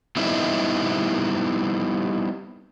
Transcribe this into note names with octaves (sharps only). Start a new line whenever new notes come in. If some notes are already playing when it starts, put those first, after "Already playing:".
G3 B3 C4 D#4 E4